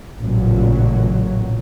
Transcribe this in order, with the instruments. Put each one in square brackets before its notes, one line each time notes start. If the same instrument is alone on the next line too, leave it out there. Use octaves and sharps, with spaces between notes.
[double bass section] A1 A#2 C#3 F#3